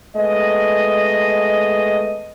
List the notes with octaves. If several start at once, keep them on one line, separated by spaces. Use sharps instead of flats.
G#3 A3 B3 D#5